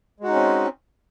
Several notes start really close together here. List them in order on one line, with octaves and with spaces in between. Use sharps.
G#3 F#4 D#4 C#4 C4